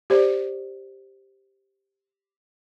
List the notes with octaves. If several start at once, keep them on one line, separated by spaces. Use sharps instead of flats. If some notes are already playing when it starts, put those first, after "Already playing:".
G4 C5 D5